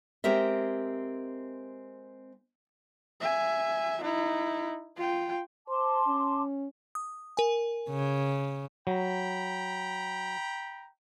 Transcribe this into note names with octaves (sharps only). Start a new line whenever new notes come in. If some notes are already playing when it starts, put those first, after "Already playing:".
G#3 C4 G4 A#4 E5
E5 G#5
D#4 E4
F4 G5
C5 A5 C6 D6
C#4
D#6
A#4 G#5
C#3
F#3 G5 A#5 B5